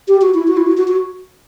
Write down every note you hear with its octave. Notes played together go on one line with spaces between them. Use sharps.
G4
F#4
E4
F#4
E4
F#4
F#4
F#4